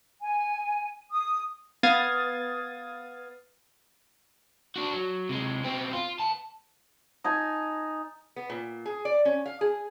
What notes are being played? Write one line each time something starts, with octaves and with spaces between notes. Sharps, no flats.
G#5
D#6
B3 F5 D#6 G#6 A6
D4 F#4
F#3
C3 G#3
B2 C4
F4
B3 A5
D#4 G#5 A5
B3
A#2
G#4
D5
C#4
F5
G#4